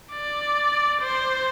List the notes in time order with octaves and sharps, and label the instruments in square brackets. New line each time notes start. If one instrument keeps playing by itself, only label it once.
[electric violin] D5
C5